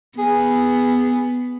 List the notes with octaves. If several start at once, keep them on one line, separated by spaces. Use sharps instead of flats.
B3 G#4